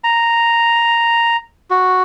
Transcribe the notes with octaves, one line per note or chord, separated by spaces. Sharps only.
A#5
F#4